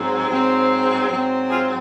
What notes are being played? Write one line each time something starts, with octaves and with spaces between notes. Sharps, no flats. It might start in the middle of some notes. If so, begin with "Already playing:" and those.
Already playing: G#2 F#3 C4
G#2 F#3 C4
G#2 F#3 C4
F4 G#4